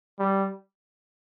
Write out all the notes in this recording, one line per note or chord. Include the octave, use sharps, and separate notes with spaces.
G3